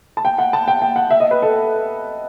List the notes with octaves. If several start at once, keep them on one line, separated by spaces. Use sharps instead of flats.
A5
G5
F#5
A5
G5
G5
F#5
E5
D#5
B4
A4